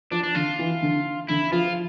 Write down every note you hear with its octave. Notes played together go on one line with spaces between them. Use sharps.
F3 D4
D4
D3 F4
E3
D3
D3 E4
F3 F4